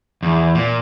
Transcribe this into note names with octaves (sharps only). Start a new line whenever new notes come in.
E2
A#2